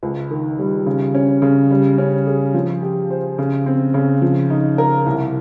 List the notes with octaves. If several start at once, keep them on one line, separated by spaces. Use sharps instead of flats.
C#2
D#3
G3
C#3
C#4
C#3
G3
C#4
G#4
F3
G4
C5
C#3
C4
C#3
F3
D#4
A#4
C2